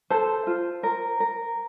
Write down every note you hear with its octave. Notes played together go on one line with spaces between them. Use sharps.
A4 C5
F4
A#4
A#4